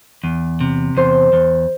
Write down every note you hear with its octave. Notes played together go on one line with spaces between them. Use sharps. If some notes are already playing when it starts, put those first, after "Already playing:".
E2
C3
E2 C5
E2